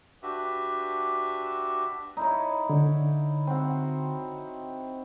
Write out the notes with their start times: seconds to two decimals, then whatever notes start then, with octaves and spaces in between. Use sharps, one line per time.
0.23 D4 F#4 G4 B4 E5
2.17 D#4 E4 C#5
2.70 D3
3.47 C4 F#4